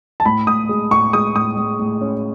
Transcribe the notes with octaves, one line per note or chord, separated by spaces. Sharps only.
A5
A2 B5
A2 D#6
G#3
A2 C#6
G#3 D#6
A2 D#6
A2
A2
C#4